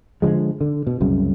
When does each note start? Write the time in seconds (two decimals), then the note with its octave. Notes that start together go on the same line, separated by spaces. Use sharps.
0.22 D3 F3 G#3
0.61 D3
0.87 B2
1.01 C2 F#2 C#3